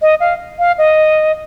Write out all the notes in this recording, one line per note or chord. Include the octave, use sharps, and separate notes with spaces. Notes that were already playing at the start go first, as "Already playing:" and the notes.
D#5
F5
F5
D#5